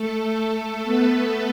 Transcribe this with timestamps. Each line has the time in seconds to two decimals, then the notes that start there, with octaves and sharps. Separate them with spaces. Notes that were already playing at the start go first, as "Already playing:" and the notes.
Already playing: A3 A4
0.37 A3 A4
0.83 B3 B4